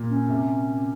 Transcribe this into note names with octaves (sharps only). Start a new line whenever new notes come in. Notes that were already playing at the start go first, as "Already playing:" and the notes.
Already playing: A#2
C#4
C3